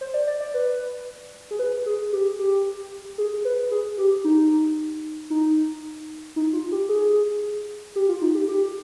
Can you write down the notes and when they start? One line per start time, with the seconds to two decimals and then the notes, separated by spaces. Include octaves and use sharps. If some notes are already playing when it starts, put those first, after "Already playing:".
0.01 C5
0.14 D5
0.27 D5
0.41 D5
0.54 B4
1.51 G#4
1.59 B4
1.86 G#4
2.13 G4
2.39 G4
3.18 G#4
3.45 B4
3.71 G#4
3.98 G4
4.24 D#4
5.30 D#4
6.36 D#4
6.53 F4
6.72 G4
6.89 G#4
7.96 G4
8.09 F4
8.22 D#4
8.35 G4
8.48 G4